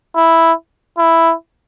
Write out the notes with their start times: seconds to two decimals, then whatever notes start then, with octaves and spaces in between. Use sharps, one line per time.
0.16 E4
0.98 E4